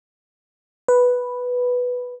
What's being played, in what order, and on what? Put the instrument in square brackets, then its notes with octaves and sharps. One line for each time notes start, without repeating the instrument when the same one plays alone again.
[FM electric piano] B4